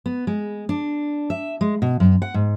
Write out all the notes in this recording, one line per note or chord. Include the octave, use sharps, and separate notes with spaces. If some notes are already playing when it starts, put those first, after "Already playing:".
B3
G#3
D4
E5
G#3
B2
F#2
F#5
G#2